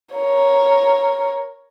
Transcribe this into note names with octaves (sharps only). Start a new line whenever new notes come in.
A#4 C#5